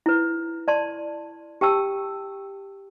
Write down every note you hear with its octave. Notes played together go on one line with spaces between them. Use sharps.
E4 B4
D5 A5 C6
G4 G5 A5 E6